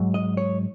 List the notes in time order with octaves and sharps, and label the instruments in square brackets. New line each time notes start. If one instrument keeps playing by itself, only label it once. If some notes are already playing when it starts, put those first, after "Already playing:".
Already playing: [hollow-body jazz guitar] G#2 F#3
D#5
C#5